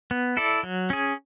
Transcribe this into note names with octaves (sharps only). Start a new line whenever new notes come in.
B3
E4 A4 D5
F#3
C#4 G#4